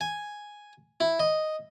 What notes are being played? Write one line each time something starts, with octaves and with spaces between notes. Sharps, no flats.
G#5
E4
D#5